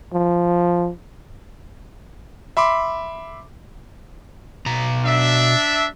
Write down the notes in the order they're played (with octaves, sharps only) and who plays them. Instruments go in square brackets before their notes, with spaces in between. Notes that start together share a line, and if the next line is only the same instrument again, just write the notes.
[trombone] F3
[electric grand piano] E5 B5 C6 D6
[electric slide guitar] B2 A#5
[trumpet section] D4 E5